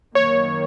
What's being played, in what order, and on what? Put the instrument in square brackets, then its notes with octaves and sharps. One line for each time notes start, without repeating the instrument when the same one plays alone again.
[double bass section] F#2 D#3 A#3 [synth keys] C#5